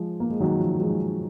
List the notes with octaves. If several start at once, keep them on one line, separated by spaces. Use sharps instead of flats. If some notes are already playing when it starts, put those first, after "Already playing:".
Already playing: F3 G#3
A#3
G#3
D#3 F#3
F3
F3 G#3